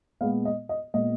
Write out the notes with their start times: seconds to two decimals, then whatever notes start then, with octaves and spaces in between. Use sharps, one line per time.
0.21 A#2 G#3 B3 F5
0.45 D#5
0.69 D#5
0.94 A#2 G#3 B3 D#5